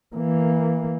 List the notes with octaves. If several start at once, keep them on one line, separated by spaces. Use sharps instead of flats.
E3 A#3